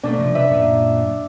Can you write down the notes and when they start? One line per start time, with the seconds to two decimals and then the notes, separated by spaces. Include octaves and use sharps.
0.03 B2 A3 A#3 D4
0.19 C3 F3
0.35 B4 E5
0.49 F#2 A#2